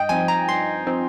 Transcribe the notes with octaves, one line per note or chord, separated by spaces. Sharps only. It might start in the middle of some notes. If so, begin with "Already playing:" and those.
Already playing: G2 D#5 G5
F3 C4 D#4 G#5
A#5
G2 C6
F3 C4 D#4